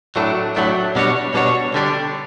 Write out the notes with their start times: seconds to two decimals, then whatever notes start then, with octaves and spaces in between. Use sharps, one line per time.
0.16 A2 F#3 A3 D4
0.56 A2 F#3 A3 D4
0.96 B2 G3 D4 F#4 C#5
1.34 B2 G3 D4 F#4 C#5
1.74 D3 G3 D4